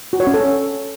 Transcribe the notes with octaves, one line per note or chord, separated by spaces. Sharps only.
F#4
C#5
C#4
A4